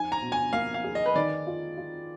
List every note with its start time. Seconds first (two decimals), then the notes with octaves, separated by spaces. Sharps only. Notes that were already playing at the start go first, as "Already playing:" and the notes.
Already playing: F2 D#4 G#5
0.12 A#5
0.22 B2
0.32 G#5
0.53 A#3 F5
0.74 F5
0.84 G#4
0.95 D#5
1.06 B4
1.15 D#3 D5
1.47 F4
1.78 F4